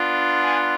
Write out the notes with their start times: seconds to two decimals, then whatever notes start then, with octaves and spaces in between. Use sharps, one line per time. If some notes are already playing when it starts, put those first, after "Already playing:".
Already playing: B3 D4 F4
0.42 F#5 G#5